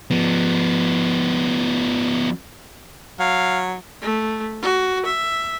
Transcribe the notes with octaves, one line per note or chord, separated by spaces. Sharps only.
F3 B3
F#3 F5
A3
F#4
E5